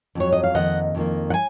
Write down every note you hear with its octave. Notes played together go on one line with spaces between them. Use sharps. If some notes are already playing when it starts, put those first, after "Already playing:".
F2 C#3 F#3 C#5
D#5
F5
F2 D#3 A#3 D#5 F#5
F2 D#3 A#3
F#5
G#5